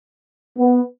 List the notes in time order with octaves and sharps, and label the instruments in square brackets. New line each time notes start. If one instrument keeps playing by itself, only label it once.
[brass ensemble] B3